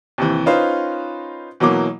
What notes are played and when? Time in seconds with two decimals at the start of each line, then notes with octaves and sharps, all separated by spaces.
0.18 D#2 C3 E3
0.46 C#4 D#4 F4 B4 C5
1.60 B2 E3 F#3 A#3 D6